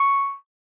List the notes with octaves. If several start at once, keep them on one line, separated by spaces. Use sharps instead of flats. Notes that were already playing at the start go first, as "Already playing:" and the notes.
Already playing: C#6